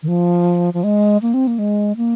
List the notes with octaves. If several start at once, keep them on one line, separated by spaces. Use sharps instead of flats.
D#3
F3
F3
G#3
A#3
C4
A#3
G#3
A#3